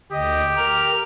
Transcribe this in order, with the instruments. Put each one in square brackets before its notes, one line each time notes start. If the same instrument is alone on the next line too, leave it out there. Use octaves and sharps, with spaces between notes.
[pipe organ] D2 D#5 [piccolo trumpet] G4
[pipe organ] A#4 F6